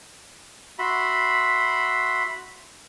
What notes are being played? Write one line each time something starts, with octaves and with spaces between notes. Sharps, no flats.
F#4 E5 B5 C6